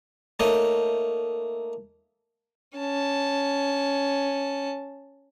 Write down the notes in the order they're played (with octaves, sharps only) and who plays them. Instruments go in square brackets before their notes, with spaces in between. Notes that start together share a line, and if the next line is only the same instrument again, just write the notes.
[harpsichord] A3 A#3 D#4 C#5 D#5
[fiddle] C#4 A5